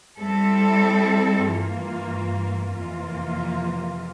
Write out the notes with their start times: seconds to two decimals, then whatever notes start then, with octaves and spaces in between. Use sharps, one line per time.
0.18 G3 C4 E4 A4
1.46 G2 E3 A#3 F4
2.73 F2 C3 E3 A#3 F4